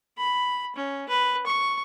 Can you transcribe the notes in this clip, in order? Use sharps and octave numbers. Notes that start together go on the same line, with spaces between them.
B5
C#4
B4
C#6